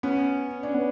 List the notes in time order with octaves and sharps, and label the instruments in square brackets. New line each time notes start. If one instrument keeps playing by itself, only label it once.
[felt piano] B3 [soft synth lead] C#4
[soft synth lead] C#4 [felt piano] D4
[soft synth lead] B3